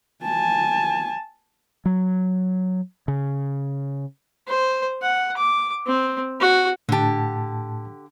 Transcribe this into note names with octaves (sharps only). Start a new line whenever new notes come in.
G#5 A5
F#3
C#3
C5
F#5
D6
C4
F#4
A2 D3 G4 A5